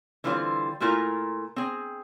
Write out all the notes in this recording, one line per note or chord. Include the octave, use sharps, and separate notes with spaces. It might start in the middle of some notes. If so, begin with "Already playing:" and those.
D3 E3 G3 C4 F4 C5
A#2 A3 E4 F4 A#4 A#5
C4 G#4